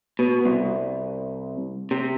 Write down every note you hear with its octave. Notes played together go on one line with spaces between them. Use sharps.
B2
C2
C3